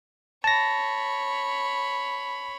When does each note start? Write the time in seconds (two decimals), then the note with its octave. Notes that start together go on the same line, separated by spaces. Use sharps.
0.44 C#5 A5 B5 A#6